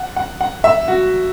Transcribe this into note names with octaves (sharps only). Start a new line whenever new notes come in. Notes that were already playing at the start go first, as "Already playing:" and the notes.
Already playing: F#5
F#5
F#5
E5
F#4